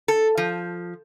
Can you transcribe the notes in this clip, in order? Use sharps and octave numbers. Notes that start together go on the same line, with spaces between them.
A4
F3